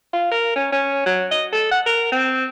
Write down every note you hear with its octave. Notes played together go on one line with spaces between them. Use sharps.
F4
A#4
C#4
C#4
F#3
D#5
A4
F#5
A#4
C4